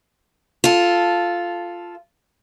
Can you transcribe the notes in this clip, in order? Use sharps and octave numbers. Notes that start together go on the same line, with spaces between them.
F4 A4